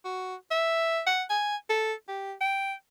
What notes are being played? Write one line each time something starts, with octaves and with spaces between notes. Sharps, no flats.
F#4
E5
F#5
G#5
A4
G4
G5